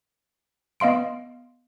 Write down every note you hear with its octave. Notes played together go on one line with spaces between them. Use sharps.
B3 D#5 F5 C6 D7